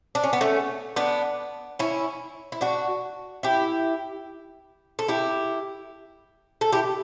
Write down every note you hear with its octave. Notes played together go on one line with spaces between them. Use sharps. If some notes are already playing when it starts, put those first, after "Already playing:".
D4
C#4
B3
A3 C#4
B3 D4
C#4 E4
E4
D4 F#4
E4 G4
A4
E4 G4
A4
E4 G4